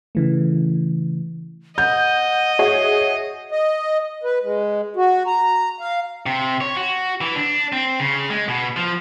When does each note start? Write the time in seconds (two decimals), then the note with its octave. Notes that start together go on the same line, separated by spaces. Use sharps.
0.15 C#3 E3 A3
1.78 D#5 F#5 G6
2.59 F#4 G#4 C#5 E5
3.51 D#5
4.23 B4
4.43 G#3
4.96 F#4
5.27 A#5
5.80 F5
6.26 C3
6.61 C#5
6.77 F#4
7.21 E3
7.35 D4
7.73 C4
8.00 C#3
8.30 G#3
8.48 B2
8.76 F3